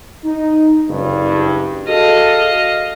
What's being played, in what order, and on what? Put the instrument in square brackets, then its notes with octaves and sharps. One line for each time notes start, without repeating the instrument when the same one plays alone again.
[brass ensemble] D#4
F#1 G2
[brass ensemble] F#4 G#4 A4 [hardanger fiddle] D#5 F5